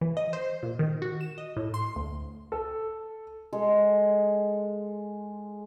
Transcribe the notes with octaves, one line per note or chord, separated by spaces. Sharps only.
E3
D#5
C5
A#2
D#3
F#4
E7
D#5
A2
C6
D2
A4
G#3 A4 C6